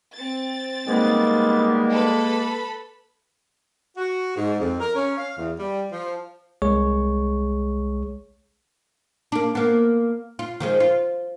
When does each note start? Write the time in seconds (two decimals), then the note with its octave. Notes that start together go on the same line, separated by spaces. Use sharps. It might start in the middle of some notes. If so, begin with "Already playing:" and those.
0.15 C4 A6
0.87 D#3 G3 G#3 A#3 B3
1.91 A4 B4 B5
3.97 F#4
4.37 G#2
4.60 F2
4.80 A#4
4.96 C#4
5.18 F5
5.38 E2
5.59 G3
5.92 F3
6.62 C2 G#3 G#4 C#5 C#6
9.32 A#3 D4
9.55 A#3 B3
10.39 F4
10.60 D#3 F3 G#3
10.80 F4